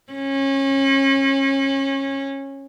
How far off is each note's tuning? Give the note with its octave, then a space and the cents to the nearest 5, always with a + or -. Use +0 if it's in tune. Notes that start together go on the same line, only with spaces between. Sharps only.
C#4 -25